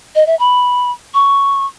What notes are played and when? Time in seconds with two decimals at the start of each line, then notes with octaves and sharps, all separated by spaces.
0.15 D#5
0.27 E5
0.39 B5
1.14 C#6